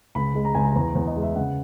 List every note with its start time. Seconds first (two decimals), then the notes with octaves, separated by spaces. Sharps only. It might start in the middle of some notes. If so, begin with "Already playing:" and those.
0.15 C#2 B5
0.35 G#3
0.45 A#5
0.54 C#2 G#5
0.64 A#5
0.75 E2 A#5
0.95 E2
1.07 D#5
1.16 G#3
1.22 E5
1.35 C#3 F#5